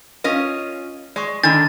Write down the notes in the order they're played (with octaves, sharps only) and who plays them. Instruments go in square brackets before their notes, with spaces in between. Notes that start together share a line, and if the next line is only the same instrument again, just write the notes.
[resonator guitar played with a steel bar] C#4 F4 D#5 [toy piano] A#4 F5
[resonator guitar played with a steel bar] G#3 [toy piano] D5 C#6
[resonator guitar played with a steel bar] D3 D#3 [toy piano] D4 D#5 B5 [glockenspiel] A6